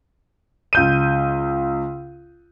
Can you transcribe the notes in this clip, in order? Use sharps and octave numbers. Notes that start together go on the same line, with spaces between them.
C#2 G6 D#7